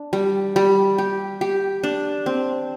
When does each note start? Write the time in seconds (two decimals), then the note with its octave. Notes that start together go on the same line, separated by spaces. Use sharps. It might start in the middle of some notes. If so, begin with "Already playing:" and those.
Already playing: D4
0.13 G3
0.56 G3
0.98 G4
1.41 G4
1.84 D4
2.26 C4